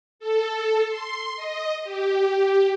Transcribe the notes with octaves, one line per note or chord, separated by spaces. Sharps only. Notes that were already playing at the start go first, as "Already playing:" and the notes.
A4
C6
D#5
G4